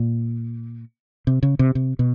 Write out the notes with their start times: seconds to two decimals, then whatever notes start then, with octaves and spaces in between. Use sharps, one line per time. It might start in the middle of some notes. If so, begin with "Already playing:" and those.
Already playing: A#2
1.27 C3
1.43 C#3
1.59 C3
1.75 C3
1.99 B2